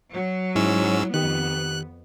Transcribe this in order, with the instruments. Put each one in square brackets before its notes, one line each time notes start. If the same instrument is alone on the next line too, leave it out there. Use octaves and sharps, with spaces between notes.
[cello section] F#3
[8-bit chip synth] G#2 C#4 E6 [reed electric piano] E4
[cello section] F2 B3 [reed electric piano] D#3 G4 [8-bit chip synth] F#6